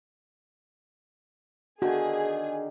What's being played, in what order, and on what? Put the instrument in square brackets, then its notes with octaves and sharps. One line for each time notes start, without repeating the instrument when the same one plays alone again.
[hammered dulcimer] D3 D#3 [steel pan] F#4 [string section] G#4